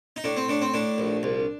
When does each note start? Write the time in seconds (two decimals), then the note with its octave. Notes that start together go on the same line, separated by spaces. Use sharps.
0.16 D#4
0.24 A2 D4
0.37 C4
0.49 A2 D4
0.61 C4
0.74 A2 D4
0.98 A#1
1.23 C2